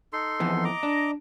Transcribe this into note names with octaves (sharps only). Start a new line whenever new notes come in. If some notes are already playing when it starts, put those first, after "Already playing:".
D#4 A4 C6
F2 E3 B3
D#5 A#5 D6
D4